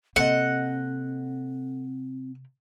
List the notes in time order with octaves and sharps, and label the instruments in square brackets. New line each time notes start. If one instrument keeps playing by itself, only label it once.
[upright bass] C3 A#3 [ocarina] C4 [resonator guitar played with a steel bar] A4 C5 D#5 [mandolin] F#5